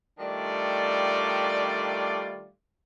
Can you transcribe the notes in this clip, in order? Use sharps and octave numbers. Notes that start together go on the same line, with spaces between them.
D#3 G3 A3 D4 F4 D5